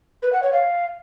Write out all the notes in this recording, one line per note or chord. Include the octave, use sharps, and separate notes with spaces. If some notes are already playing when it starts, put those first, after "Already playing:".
B4
F#5
C#5
F5